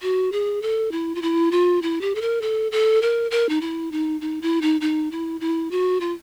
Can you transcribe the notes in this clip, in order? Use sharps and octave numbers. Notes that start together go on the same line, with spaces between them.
F#4
G#4
A4
E4
F4
E4
F4
E4
G4
A4
A#4
A4
A4
A#4
A#4
D#4
E4
D#4
D#4
E4
D#4
D#4
E4
E4
F#4
F4